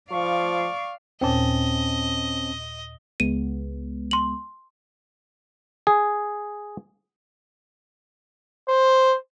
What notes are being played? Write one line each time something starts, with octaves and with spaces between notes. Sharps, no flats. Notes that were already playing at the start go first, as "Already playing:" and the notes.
F3 D5 F5 C#6
D#2 A#2 C4 C#4 D#5 A5
C#2 G#3 B3 D#7
C6 F#7
G#4
C5